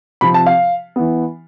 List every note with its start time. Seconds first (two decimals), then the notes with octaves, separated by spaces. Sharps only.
0.21 C3 F3 C4 B5
0.34 A5
0.46 F5
0.96 E3 B3